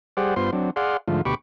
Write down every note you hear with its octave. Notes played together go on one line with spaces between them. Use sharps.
G3 G4 G#4 C5 D5 F#5
G2 B3 F4 C5 C6
F#3 C4 D4
G#4 D5 F5 F#5 C6
G#2 D3 F3 A3 F4
D2 B2 G4 B5 C#6 D6